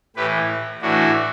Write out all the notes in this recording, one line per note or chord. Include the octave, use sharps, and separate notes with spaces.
A2 E3 G4 B4
A2 E3 D4 F#4